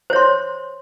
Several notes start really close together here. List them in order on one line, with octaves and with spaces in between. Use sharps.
C5 C#5 C6